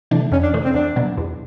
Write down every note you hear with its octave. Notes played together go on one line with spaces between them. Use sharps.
C3 E3 A3 D4
F2 C#4
D4
C3 E3 A3 D4
C4
E2 D4
B2 F#3 B3
E2